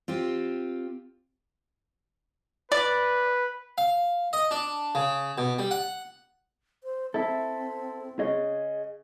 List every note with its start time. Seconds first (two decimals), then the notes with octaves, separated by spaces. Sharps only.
0.08 C4 F4 G4
2.72 B4 D5
3.78 F5
4.33 D#5
4.51 D4
4.95 C#3
5.38 B2
5.59 G3
5.71 F#5
6.84 C5
7.14 C4 E4 A4 E5
8.19 C#3 G#4 D#5